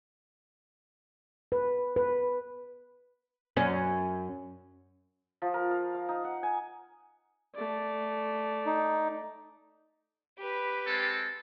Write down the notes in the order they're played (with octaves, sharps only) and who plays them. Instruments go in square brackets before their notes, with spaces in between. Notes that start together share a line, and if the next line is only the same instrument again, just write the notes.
[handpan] B4
B4
[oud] F#2 C#4
[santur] F3
A#4
F5
F5
D#4
F#5
G#5
[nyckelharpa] A3 D5
[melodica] D#4
[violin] G4 B4
[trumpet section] G#3 C4 A4